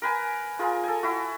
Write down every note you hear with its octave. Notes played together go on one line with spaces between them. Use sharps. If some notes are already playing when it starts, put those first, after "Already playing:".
A#4 B4 G#5
F4 G#4 A#4
A4 G#5
E4 F#4